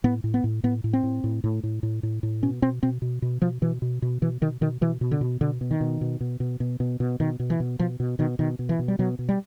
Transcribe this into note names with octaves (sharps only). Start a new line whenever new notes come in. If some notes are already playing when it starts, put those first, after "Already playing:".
A2 B3
A2
B3
A2
A2 B3
A2
C4
A2
A2
A2
A2
A2
A2
A2
B2 C#4
B2 C4
B2 C4
B2
B2
B2 F3
B2 E3
B2
B2
B2 E3
B2 D#3
B2 D#3
B2 E3
B2
D3
B2
B2 D3
B2
D#3
B2
B2
B2
B2
B2
B2
B2
B2 D#3
B2
E3
B2
B2 F3
B2
B2 D#3
B2 D#3
B2
E3
B2
G3
B2 F#3
B2
G3